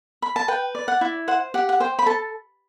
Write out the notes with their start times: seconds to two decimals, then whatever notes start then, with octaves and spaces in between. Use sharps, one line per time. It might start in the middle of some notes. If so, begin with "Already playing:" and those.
0.22 B5
0.36 A5
0.48 B4 G5
0.75 D5
0.88 F#5
1.01 E4
1.28 C5 F#5
1.54 G4 F#5
1.69 F#5
1.80 C5 G5
1.99 B5
2.06 A4 A5